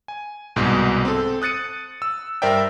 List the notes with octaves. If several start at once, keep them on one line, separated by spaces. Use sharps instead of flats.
G#5
C2 G#2 B2 G#3 G#4 G6
C4 A4
D#6 F#6 A6 C#7 D#7
E6
G2 A#4 C5 D5 E5 G5